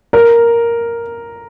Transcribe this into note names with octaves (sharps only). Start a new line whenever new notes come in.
A#4